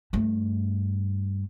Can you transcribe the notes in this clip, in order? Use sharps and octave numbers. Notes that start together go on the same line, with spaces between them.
G2 A3